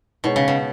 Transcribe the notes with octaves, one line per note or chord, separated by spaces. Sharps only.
B2 G#3 D#4 G#4 C#5
C#3
B2